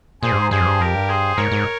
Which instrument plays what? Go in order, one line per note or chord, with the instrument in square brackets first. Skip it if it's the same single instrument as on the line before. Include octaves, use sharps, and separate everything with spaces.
[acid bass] A#2 [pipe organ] G#4 C5
[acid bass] G2
G#2
[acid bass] G2 [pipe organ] G#4 C5
[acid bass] F2
G2
[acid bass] F2 [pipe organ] G4 A#4
[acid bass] G2
[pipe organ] G#4 C5
[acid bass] G#2 [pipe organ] A#4 C#5
[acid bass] G#2